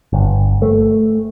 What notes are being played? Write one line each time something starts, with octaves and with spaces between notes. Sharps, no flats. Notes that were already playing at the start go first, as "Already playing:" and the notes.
G1
A3